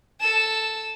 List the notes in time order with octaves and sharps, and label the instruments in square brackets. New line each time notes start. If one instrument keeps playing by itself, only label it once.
[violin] A4 E7